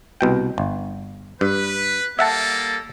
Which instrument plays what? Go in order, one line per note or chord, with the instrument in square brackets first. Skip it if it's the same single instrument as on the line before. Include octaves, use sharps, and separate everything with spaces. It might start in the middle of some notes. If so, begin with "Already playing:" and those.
[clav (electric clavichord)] C2 B2 G5
G1
[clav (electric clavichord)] G2 [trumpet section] B4
[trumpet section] G3 A#3 A4 [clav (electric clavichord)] E5 F#5 A5